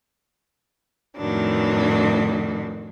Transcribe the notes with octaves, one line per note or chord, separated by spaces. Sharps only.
F2 A2 D#3 E3 F#3 D4